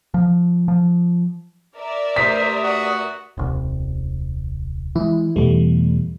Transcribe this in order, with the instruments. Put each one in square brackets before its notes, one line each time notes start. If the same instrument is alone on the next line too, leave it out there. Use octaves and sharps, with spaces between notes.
[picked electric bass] F3
F3
[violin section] A#4 D5 E5
[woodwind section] G2 A3 D#6 [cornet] C5 [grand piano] B6
[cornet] F#4
[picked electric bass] D#1 C2
[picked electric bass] E3 G#3 [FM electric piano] E4
[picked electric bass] E2 B2 [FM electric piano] E3 G3 A3